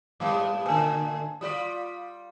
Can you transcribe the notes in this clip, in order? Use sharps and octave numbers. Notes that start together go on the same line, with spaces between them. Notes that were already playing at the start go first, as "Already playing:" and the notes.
G#2 G3 B3 F5 A5 D6
A2 D3 B4 G#5 A5
G3 F4 D5 D#6 B6